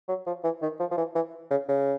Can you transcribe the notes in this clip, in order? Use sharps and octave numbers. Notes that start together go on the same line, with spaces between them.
F#3
F3
E3
D#3
F3
F3
E3
E3
C#3
C#3